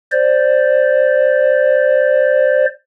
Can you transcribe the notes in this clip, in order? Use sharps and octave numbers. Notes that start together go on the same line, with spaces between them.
C5 D5